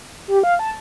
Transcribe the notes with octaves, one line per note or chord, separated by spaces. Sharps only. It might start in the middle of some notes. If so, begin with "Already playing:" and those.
G4
F5
A5